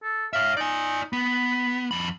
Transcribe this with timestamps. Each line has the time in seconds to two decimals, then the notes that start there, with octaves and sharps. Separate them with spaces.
0.03 A4
0.33 C#5 E5 F5
0.57 D#4 D5 G#5
1.13 B3 B5
1.91 F2 B5